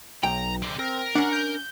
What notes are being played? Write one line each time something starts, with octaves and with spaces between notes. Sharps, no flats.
B1 G5 A#5
D3 C4
C4 A#4
C#4 D4 F#5 A#5
G6